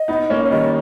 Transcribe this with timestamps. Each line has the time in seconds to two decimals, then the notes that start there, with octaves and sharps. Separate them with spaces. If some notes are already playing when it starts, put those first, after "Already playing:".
Already playing: D#5
0.08 B3 D#4
0.30 A#3 C#4
0.44 C#5
0.51 D#3 G3 D#5